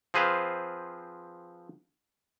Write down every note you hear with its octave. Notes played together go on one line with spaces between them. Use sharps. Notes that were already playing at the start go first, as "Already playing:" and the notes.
F3 C4 G#4 B4 C5 F5